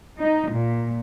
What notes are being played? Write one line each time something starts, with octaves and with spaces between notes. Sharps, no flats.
D#4
A#2